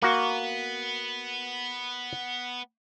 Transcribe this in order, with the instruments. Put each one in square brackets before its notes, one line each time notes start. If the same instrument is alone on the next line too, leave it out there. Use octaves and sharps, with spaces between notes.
[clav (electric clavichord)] A#3 F#4 [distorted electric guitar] B3